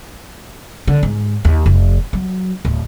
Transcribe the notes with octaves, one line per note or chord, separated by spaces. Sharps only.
D3
G#2
D#2
F1
F#3
D1